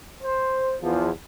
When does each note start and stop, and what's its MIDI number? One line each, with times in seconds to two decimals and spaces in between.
0.23 0.75 72
0.81 1.11 40
0.81 1.11 53